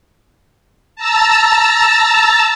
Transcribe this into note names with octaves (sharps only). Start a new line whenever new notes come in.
A5 A#5 E6 A6